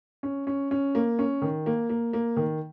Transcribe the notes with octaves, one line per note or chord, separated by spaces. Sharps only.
C#4
C#4
C#4
A#3
C#4
D#3
A#3
A#3
A#3
D#3